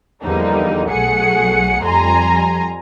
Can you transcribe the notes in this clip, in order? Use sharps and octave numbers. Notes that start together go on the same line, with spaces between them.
E2 D3 F3 G3 A#3 D#4
B1 F#3 A3 G#4 F#5 C#7
F2 G3 G#5 A#5 C6